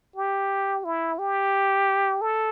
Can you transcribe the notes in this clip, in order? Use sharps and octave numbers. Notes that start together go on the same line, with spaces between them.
G4
E4
G4
A4